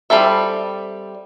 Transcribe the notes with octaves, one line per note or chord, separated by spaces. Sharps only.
G3 C4 A4 E5